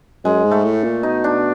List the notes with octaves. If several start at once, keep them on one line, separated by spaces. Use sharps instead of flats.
F#2 G#3
G#2
A3
A2
A#2
B2 D#4
D4